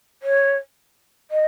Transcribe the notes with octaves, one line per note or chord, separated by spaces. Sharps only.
C#5
D#5